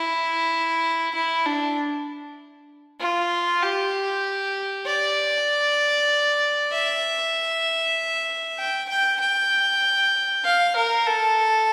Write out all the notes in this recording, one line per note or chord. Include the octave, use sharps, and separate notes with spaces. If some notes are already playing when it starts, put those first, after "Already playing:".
Already playing: E4
E4
D4
F4
G4
D5
E5
G5
G5
G5
F5
A#4
A4